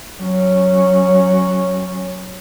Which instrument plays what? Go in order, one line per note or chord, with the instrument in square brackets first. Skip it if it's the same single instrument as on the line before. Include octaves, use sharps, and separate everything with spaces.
[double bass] F#3 C#4